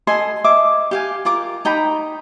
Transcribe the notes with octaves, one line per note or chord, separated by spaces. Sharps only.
A4 D#5 G#5 C6
D#5 E5 D6
G4 F5 G#5
F4 A#4 D6
D#4 G5 A#5 B5